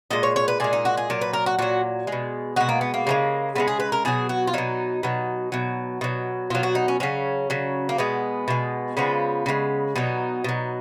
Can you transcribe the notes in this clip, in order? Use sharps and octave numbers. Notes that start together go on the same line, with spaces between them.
A#2 G#3 D#5
C#5
C#5
B4
A#2 G#3 G#4
D#4
F#4
G#4
A#2 F#3 A#4
B4
A#4
F#4
A#2 F#3 F#4
B2 G#3
B2 G#3 F#4
A#3
B3
A#3
C#3 F3 G#3
C#3 F3 G#3 B3
G#4
B4
A#4
B2 F#3 G#4
F#4
F4
B2 F#3 D#4
B2 F#3
B2 F#3
B2 F#3
B2 F#3 F4
F#4
D#4
C#4
C#3 F#3 C#4
C#3 F#3
A#3
B2 G#3 B3
B2 G#3
C#3 F3 G#3 B3
C#3 F3 G#3
B2 F#3 D#4
B2 F#3